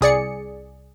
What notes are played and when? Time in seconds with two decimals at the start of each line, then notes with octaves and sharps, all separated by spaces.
0.01 C2 G#4 D5 C#7